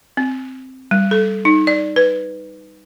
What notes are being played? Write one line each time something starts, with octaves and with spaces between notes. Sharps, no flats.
C4
G3
A4
D#4
D5
B4